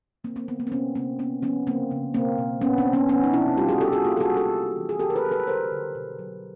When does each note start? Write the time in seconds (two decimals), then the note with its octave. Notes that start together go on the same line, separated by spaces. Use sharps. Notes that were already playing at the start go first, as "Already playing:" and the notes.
0.24 D3 A#3 C4
0.36 A#3 C4
0.48 D3 B3
0.60 A#3
0.67 C4
0.72 C3 B3 C#4
0.95 C3 A#3 C4
1.19 A#3 B3 C#4
1.42 F3 B3 C#4
1.67 C#3 A#3 C4
1.91 C#3
2.14 B2 A#3 C4
2.38 B2
2.61 A#2 B3 C#4
2.78 C4 D4
2.86 A#3
2.93 B3 C#4
3.09 F3 B3 C#4
3.24 D#4
3.33 C3 D4 E4
3.57 G3 F4 G4
3.69 F#4 G#4
3.81 G3 G4 A4
3.93 F#4 G#4
4.05 A#3 F4 G4
4.17 A4
4.20 F#4 G#4
4.28 G3
4.36 G4 A4
4.52 C3
4.76 E3
4.89 G#4
4.99 C#3 G4 A4
5.10 A#4
5.16 A4 B4
5.24 F#3
5.31 A4 B4
5.47 D3 A#4 C5
5.71 D3
5.95 B2
6.19 F#3